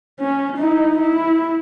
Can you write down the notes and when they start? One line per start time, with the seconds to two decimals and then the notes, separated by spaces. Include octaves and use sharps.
0.20 C#4
0.58 D#4 E4
0.98 E4